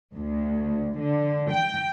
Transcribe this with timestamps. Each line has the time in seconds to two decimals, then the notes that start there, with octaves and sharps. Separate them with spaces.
0.14 D2
0.97 D3
1.50 G5